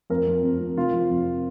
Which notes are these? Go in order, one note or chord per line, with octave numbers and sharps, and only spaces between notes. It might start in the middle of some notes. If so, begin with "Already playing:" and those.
F2 A#4
F2
F2
F3
C3 F4
F3
F2